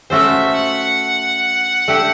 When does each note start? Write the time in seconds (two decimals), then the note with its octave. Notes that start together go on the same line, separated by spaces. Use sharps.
0.10 A3 C#4 F#4 A4 C5 E5
0.55 F#5
1.88 A3 D4 G4